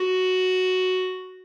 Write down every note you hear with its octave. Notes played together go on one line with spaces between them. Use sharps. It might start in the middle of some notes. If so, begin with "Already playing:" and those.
Already playing: F#4